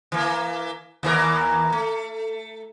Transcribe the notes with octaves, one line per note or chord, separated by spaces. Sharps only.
E3 A#3
D#2 E3 A#4
A3